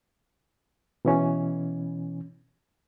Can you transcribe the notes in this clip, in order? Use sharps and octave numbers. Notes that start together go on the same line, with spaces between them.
B2 E3 C#4